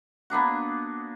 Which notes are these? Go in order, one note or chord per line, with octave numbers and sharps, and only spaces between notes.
A#3 B3 D4 F#4